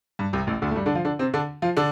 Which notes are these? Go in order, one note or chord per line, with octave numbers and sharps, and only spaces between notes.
G2
C2 C3
A1 A2
D2 D3
A3
G2 G3
D3 D4
F3 F4
D3 D4
C3 C4
D3 D4
F3 F4
D3 D4